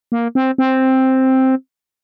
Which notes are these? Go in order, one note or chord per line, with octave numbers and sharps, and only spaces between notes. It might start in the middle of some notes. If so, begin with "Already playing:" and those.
A#3
C4
C4